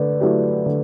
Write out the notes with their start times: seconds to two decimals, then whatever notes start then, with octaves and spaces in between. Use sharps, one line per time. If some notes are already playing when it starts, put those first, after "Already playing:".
Already playing: D3 A3 B4 D5
0.20 F#3 A3 E4 G4
0.66 D3